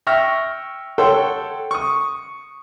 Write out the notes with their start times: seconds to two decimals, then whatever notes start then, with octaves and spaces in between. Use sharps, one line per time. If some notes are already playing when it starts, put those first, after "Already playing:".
0.07 E5 G5 C#6 F6 A#6
0.98 A4 C#5 F#5 G5 C6 E6
1.71 C#6 D#6